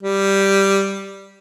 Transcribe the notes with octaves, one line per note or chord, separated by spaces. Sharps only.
G3